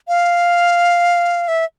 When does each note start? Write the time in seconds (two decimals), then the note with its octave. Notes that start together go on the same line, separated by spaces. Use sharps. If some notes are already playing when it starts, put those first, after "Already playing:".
0.08 F5
1.48 E5